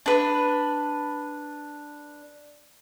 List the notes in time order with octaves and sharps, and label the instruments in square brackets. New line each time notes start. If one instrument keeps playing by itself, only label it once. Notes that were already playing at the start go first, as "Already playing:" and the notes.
[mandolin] D4 B4